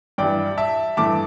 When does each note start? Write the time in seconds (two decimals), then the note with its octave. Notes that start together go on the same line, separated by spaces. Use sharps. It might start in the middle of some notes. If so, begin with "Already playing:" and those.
0.18 G2 E3 G3 D5 G5
0.58 E5 A5
0.97 G2 E3 A3 A5 D6